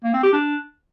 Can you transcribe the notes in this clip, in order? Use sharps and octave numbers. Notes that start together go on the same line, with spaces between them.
A#3
C4
G4
D4